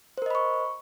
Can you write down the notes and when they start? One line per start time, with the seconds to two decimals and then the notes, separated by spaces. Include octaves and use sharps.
0.18 C5
0.22 A#4
0.26 D#5
0.30 B5
0.35 C#6